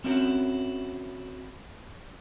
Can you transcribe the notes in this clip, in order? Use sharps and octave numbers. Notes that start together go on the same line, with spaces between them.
C4 C#4 E4 F#4 A#4